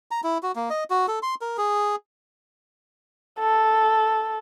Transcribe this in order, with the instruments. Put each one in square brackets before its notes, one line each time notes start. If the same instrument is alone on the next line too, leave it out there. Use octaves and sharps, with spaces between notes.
[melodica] A#5
E4
F#4
A#3
D#5
F#4
A4
C6
A#4
G#4
[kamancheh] A4